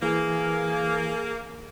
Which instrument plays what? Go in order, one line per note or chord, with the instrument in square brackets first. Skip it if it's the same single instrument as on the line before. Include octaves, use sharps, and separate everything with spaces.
[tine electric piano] E3 [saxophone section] A#3 [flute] G#4